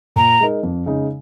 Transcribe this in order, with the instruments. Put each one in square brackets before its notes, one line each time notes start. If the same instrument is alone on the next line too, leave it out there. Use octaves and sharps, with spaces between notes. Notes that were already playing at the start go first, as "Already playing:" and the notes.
[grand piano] A#2 [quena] A#5
[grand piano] G#3 D#4 A#4
F2
C#3 G#3 D#4